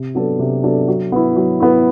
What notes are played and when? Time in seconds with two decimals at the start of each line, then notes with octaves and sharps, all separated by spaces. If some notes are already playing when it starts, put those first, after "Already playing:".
Already playing: C3
0.15 F#3 B3 D4 A4
0.39 C3
0.64 F#3 B3 D4 A4
0.88 F#3
1.12 B3 E4
1.36 F#3
1.60 B3 E4